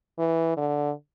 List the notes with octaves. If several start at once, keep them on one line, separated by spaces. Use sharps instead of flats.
E3
D3